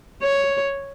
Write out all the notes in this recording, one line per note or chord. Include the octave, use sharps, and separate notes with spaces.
C#5